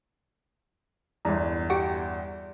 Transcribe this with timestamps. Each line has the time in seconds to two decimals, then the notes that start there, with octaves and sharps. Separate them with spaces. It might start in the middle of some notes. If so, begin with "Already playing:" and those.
1.25 G1 E2
1.70 F#4 G4